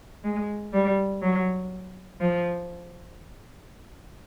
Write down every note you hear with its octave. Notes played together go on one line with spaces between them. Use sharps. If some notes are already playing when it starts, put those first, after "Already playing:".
G#3
G3
F#3
F3